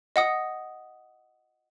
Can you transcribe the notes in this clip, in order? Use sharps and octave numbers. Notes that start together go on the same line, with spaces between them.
D#5 F#5 D#6